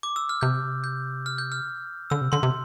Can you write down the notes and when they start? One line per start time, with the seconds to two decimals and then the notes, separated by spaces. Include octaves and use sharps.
0.03 D6
0.16 E6
0.29 F6
0.41 C3 G6
0.84 G6
1.26 F6
1.38 G6
1.52 F6
2.10 D3 E6
2.21 C3
2.32 D3 C6
2.43 C3